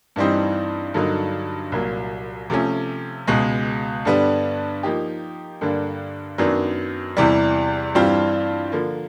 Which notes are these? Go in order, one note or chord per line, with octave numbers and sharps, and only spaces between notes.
G2 E3 G3 C4 D#4
G2 D3 F#3 A#3 D#4
C2 A#2 F#3 A#3
C3 F3 A3 C#4
C#2 B2 G#3
G2 D3 G3 B3 D4
F3 A#3 D#4 G4
G2 D3 G3 A#3 D4
F#2 D#3 F#3 B3 D4
E2 C3 E3 G3
G2 E3 G3 C4 F4
D3 F3 A#3